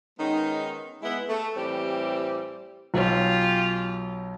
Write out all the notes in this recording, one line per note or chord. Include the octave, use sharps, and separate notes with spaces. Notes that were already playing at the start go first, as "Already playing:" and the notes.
D#3 G#3 B3 C#4 D#4
G#3 B3 E4
A3
A2 E3 G3 C4 G4
B1 F4 G4 G#4 C#5